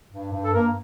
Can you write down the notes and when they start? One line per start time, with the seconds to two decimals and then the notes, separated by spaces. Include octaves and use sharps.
0.13 G2
0.32 G2
0.44 A4
0.53 G2 A#3 A#4